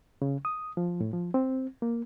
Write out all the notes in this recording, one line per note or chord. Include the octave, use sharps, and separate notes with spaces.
C#3
D#6
F3
A2
F3
C4
A#3